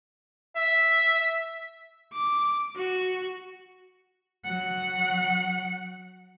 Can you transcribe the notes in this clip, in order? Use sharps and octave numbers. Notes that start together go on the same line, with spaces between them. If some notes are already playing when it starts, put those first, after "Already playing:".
E5
D6
F#4
F#3 F#5